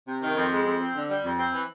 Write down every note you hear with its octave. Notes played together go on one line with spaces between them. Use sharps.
C3
D#3
F2
G#3
F2
C4
D3
G3
F2
C4
E3